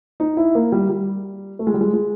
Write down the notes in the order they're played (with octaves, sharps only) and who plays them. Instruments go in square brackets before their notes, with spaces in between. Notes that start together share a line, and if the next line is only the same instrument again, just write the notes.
[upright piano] D#4
E4
A#3
G3
G3
A3
G#3
G3
G#3
G#3